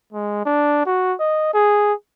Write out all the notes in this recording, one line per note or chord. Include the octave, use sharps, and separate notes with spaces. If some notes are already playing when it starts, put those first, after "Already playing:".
G#3
D4
F#4
D#5
G#4